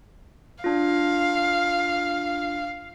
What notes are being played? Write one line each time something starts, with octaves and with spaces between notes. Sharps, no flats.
D4 F4 F5